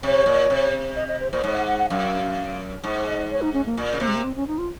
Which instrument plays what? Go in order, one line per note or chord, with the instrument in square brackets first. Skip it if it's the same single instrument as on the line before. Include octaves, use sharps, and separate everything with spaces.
[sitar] C3 [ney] C#5
[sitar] A#2
C3
[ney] D#5
D#5
C5
[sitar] A#2 [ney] C5
[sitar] G#2 [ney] C#5
[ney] F#5
F#5
F#5
[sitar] F#2 [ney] F5
[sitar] G#2
[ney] D#5
C#5
D#4
C#4
A#3
[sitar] A#2
C#3
[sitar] C3 [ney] A#3
[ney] G#3
A#3
C4
C#4
D#4
F4